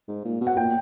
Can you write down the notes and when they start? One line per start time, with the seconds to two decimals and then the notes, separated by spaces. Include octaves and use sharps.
0.08 G#2
0.25 A#2
0.41 B2
0.47 F#5
0.57 A#2 G5